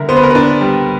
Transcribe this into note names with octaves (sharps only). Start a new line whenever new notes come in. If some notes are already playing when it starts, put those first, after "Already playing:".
Already playing: D3 G3 A#4 E5
B3 C5
B4
A#4
D4 B4
G3